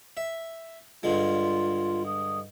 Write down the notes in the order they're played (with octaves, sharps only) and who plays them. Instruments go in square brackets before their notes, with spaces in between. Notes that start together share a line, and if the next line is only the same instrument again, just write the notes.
[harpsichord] E5
[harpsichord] G2 D3 G#3 [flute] F4
[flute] D#6